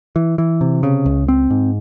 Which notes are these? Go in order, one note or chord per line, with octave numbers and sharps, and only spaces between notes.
E3
E3
C3
C#3
C#2
C4
G#2